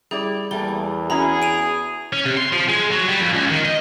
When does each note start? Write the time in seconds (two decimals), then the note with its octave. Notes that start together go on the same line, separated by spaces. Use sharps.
0.11 G3 E4 G#4 D5
0.51 E2 G3 A3 A#3 G7
1.10 C#4 E4 F#4 G#4 A#5 B5
1.42 D7 D#7 F7
2.13 C#4
2.26 C3
2.37 C6
2.52 F3
2.68 G#3
2.91 F#3
3.08 G3
3.20 F2
3.33 C#2
3.49 D#3
3.65 D#5